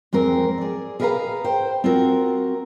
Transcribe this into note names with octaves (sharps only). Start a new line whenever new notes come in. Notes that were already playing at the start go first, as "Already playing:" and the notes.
F2 G#3 C4 A#4
G#4 D5
G#4 A#4 B4 D#5 F5 A#5
C5 G5
C4 F4 F#4 A4 A#4